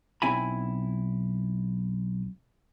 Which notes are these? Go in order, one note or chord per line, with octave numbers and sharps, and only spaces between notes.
B1 C4 E4 G#5 B5